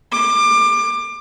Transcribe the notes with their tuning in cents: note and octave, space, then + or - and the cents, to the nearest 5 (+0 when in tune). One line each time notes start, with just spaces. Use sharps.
D6 +25